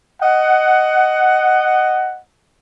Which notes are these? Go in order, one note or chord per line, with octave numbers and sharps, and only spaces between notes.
D#5 F#5